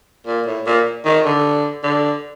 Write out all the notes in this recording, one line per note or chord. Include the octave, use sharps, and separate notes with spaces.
A#2
A2
A#2
D#3
D3
D3